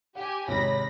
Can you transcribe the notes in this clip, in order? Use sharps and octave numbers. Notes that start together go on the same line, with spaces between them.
G4 F#5 G#5
G#1 C3 G#3 C#5 B5 A#6